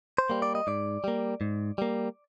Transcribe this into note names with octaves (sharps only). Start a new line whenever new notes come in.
C5
G3 A#3
D5
D#5
G#2 D5
G3 A#3
G#2
G3 A#3